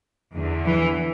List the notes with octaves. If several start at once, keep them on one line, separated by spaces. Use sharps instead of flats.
E2 D3
E3